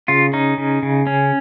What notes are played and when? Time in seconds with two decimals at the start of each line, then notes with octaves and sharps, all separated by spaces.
0.08 C#3 F4
0.33 C#4 D#4
0.58 C#3
0.83 C#3
1.07 C#4